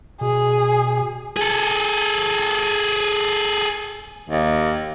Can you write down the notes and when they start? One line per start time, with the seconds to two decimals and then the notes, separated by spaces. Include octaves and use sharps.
0.21 B2 G#4
1.37 G#4 A4
4.29 D#2